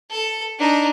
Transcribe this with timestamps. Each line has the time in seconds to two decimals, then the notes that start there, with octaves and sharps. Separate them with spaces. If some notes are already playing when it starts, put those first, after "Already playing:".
0.11 A4
0.59 D4 D#4